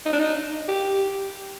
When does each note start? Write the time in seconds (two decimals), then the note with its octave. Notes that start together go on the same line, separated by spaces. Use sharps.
0.06 D#4
0.13 D4
0.19 D#4
0.68 G4